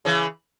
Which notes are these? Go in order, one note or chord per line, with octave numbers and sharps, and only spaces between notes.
C#3 E3